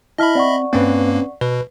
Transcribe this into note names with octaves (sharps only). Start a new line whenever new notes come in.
E4 D#5 E5 A5 B5 F6
C4 D5 F#5 C#6
G2 A#3 C4 C#4 B4
B2 B4